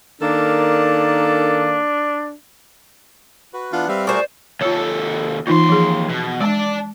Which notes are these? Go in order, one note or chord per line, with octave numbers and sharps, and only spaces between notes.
D#3 A#3 D4 A4
F#4 B4
E3 B3 D4 F4 F#5
G3 C4 B4 E5 F5
A3 F#4 G#4 A#4 C5 D5 C#6
D#2 F4 A4 C#5
D#2 E3 D#4 F4 C6
F3 G#4
B2
G#3 D5 A5